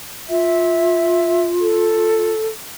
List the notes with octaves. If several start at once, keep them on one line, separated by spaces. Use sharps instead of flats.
F4 E5
A4